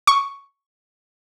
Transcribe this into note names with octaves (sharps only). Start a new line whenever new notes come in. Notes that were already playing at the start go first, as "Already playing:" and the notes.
C#6